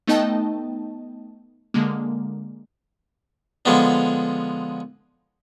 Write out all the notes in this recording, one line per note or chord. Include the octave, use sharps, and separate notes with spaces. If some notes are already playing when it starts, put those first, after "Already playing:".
A3 B3 D#4 D#5 G5 A5
D3 G#3 A#3
D3 F3 G#3 B3 D4